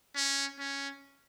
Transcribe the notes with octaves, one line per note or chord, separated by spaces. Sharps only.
C#4
C#4